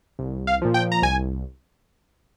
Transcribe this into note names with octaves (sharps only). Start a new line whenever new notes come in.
C2
F5
A#2 F3
G5
A#5
C2 G#5